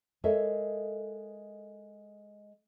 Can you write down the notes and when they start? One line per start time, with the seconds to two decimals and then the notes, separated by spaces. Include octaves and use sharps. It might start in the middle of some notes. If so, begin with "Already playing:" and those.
0.24 G#3 A4 A#4 C#5 D#5 E5